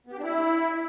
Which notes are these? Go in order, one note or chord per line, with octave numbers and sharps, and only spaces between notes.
B3
G4
D4
E4